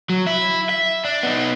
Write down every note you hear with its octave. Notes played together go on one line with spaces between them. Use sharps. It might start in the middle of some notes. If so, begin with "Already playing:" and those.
F#3
E4
E5
D4
B3 D#4